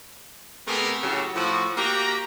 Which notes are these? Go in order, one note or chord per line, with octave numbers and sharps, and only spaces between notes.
C3 A3 B3 G4 G#4 A#4
A2 C#3 F#3 A3 F#4 G4
A2 F3 F#4
A#3 F#4 G4 G5 A#5